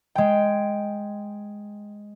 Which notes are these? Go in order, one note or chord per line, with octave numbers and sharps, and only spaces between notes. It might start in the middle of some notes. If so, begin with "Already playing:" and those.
G#3 G5